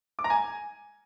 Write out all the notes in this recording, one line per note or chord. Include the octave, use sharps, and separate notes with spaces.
D6
A#5
G#5